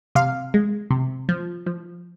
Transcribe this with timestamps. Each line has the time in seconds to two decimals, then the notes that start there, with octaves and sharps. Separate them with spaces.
0.15 C3 F5
0.54 G#3
0.91 C3
1.29 F3
1.66 F3